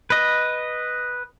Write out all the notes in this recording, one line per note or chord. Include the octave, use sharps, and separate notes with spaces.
B4 D#5